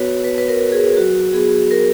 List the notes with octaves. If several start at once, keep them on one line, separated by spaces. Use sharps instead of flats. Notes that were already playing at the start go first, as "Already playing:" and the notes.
Already playing: B3 F#4 B4 C#5
B3 B4
B4
A#4
F#4
G#4
F#3 F#4
B3 G#4
F#4 A#4